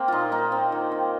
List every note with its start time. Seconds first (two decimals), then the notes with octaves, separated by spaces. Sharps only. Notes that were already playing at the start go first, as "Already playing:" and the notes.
Already playing: A#3 C4
0.08 A#2 D#4 F4
0.32 A#3 D#4
0.52 C4
0.72 D#3
0.92 C4